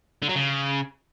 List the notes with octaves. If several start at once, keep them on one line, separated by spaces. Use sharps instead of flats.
D3
F#3
C#3